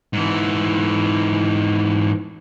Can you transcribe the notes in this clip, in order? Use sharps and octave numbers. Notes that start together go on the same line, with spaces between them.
G#2 E3